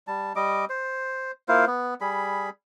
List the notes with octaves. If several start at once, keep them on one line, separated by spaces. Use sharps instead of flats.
G3 A5
G3 D#5 D6
C5
A#3 E4 F4 C5
B3
G3 G#4 B5